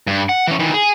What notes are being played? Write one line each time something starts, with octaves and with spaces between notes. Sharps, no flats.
G2
F#5
E3 C#4
D#3 E3
G#4